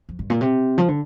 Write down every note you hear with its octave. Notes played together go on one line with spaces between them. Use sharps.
F2
G2
A#2
C3
F3
D3